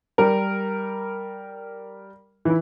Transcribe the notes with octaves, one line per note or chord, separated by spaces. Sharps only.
G3 A#4
E3 E4